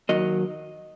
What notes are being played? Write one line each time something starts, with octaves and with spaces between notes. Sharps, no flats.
D#2 D#3 F#3 A#3 D#5